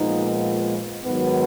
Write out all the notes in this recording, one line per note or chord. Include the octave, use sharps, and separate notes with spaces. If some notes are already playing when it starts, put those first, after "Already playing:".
Already playing: A#2 F3 G#3 B3 D#4
G#2 D#3 F#3 B3